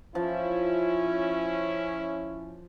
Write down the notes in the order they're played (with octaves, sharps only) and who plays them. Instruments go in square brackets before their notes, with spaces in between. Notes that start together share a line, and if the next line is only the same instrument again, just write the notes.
[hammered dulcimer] F3 [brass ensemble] C#4 E4